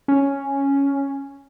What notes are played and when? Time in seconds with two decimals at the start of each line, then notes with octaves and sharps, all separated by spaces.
0.08 C#4